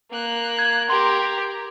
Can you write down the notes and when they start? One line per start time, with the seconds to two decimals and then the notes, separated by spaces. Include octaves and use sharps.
0.11 A#3 F#6
0.59 G#6
0.90 G4 A#4 C6